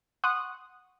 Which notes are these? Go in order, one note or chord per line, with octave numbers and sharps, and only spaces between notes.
F#5 C6 C#6 D#6 F#6